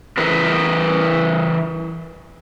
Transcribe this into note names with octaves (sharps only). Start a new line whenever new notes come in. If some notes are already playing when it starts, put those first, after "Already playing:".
E3 A#4 B4